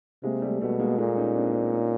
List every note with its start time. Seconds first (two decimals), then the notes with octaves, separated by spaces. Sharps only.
0.23 C3 G#3 A#3
0.42 G3 A3
0.61 B2 G3 A3
0.80 G#3 A#3
0.98 A#2 G#3 A#3
1.17 C#4 D#4
1.35 C4 D4
1.54 C4 D4
1.73 C#4 D#4